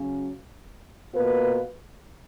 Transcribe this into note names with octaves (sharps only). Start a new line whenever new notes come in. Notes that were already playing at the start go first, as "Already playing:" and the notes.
Already playing: C#3 F#3 C#4
B2 A#3 F4 B4